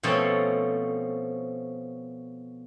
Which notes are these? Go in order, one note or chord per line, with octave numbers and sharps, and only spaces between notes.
B2 F3 A3 C4 C#4 A4